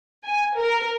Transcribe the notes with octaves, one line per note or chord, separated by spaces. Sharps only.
G#5
A#4